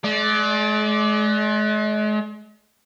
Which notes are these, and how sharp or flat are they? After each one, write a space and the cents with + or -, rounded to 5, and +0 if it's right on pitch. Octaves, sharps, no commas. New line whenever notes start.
G#3 +40 D5 +0